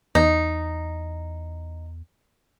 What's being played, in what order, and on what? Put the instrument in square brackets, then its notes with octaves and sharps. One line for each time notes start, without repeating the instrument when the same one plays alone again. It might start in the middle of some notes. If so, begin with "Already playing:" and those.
[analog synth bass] E2 [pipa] D#4